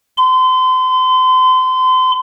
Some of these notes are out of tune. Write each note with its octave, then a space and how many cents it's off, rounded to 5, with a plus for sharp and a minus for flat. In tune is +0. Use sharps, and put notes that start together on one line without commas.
C6 -35